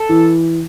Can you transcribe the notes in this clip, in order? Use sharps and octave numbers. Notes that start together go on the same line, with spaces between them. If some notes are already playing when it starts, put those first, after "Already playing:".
Already playing: A4
E3